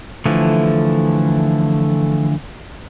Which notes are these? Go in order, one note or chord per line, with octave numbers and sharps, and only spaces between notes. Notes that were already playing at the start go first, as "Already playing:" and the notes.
D3 E3 F3 A3